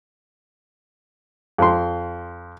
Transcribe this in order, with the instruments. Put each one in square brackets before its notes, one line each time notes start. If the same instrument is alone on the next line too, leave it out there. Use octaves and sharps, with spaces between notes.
[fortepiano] F2 C6